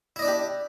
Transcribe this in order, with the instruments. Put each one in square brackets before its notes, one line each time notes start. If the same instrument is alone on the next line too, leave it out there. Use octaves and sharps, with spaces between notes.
[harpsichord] E4
D#5
D5
D4
G4